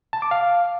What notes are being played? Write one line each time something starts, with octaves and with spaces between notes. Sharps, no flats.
A5
D6
F5